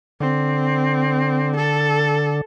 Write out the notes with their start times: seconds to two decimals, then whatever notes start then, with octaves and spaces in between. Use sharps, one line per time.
0.21 D3 C4
1.57 A4